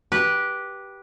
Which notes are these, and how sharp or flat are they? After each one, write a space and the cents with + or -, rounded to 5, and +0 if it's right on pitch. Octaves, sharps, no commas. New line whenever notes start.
G4 -5 B4 -15